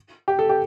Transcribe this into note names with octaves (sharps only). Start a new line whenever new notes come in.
G4
A4
G4